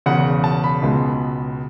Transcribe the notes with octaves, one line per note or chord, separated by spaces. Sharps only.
E1 E2 C#3 F#5
A5
B5
C#2 B2 G#3